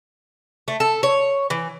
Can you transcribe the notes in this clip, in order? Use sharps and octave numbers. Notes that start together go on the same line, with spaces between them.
A3
A4
C#5
E3